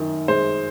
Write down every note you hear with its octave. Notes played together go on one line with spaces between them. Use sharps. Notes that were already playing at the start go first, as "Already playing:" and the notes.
Already playing: F#2 D#3
G#3 C5